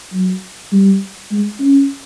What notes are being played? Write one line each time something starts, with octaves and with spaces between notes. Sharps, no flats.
F#3
G3
G#3
C#4